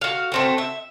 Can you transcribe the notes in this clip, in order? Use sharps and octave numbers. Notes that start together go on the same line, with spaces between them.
F#4 F5
A3 C4 F#4
E5